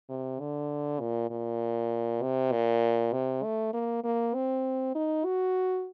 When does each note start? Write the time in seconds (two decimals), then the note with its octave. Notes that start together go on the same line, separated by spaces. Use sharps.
0.09 C3
0.40 D3
1.00 A#2
1.30 A#2
2.22 C3
2.52 A#2
3.13 C3
3.43 A3
3.73 A#3
4.04 A#3
4.34 C4
4.95 D#4
5.25 F#4